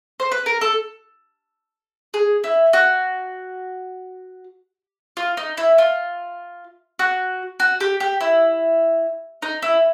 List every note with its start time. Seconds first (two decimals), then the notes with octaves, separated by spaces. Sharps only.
0.20 C5
0.31 B4
0.46 A#4
0.61 A4
2.14 G#4
2.44 E4
2.73 F#4
5.17 F4
5.37 D#4
5.57 E4
5.78 F4
6.99 F#4
7.60 F#4
7.80 G4
8.00 G4
8.21 E4
9.42 D#4
9.62 E4